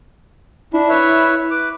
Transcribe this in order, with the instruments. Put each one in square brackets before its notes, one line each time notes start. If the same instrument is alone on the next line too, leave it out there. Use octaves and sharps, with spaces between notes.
[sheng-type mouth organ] D4 [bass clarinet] E4
[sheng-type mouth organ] B4 C#5 E5
B4 D6